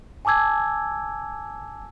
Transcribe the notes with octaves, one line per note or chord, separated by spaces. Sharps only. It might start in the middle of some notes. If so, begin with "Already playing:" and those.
G#5 A5 D6 E6 G#6